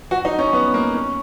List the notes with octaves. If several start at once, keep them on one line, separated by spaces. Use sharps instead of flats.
F#4
D#4
C#4
B3
A#3
C#4